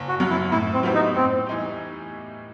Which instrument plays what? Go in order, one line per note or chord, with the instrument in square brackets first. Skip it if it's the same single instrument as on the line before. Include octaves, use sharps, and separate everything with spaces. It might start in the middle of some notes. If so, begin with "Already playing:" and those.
Already playing: [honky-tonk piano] F#1
[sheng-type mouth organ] F#4
[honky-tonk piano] F#2 F#3
[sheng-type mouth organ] E4
[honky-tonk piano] A2 [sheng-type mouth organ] E4
[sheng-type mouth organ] C4
[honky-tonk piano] F#3 B3 E4 G4
[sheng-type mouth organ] D#4
[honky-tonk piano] A2 [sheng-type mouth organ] C4
[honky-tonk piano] E3 G3 D#4 G4